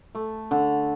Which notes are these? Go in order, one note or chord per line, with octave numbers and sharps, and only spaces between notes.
A3
D3